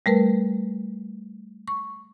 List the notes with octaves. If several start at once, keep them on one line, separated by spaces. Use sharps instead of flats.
G3 A3 A#4 B4
C#6